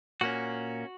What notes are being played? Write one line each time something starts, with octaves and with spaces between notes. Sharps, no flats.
A#2 A#3 C#4 F#4